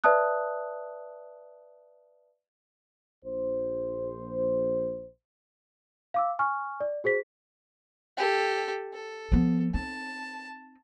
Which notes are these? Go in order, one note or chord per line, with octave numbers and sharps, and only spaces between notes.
B4 D5 E5 A5 D#6 F#6
A#1 C5
F5 D6 E6
G#5 C#6 F6
D5
F#4 G#4 C5 B6
G4 A4
A4
F3 B3
C4 D#4 A5